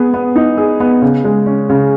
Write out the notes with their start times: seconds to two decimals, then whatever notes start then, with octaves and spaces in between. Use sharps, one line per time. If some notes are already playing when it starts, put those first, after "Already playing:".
Already playing: B3 G#4
0.14 B3
0.36 D#4
0.58 G#4
0.80 B3
1.02 C#3
1.24 G#3
1.46 C#4
1.70 C#3